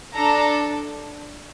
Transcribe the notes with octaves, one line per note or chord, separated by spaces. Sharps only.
D4 A4 A#5